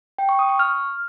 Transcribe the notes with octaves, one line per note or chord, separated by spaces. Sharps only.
G5
C#6
D#6
C#6
F6